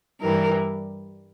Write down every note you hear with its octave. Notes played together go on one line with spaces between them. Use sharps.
G2 E3 G3 A#4